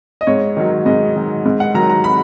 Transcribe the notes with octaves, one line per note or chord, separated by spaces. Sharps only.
D#5
G#2 C#5
D#3 F#3
G#2 D#5
D#3 F#3
G#2
F#5
D#3 F#3 A#5
A#5
B5